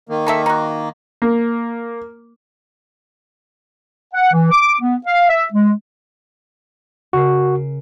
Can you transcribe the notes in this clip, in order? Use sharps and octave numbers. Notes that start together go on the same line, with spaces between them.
D#3 A#3
D#4 A4 E5
D#4 F#4
A#3
F#5
E3
D6
B3
F5
E5
G#3
C#3 F#4 A#4 C7